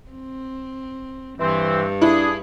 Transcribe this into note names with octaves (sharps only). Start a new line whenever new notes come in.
C4
G2 E3 C4
D4 E4 G#4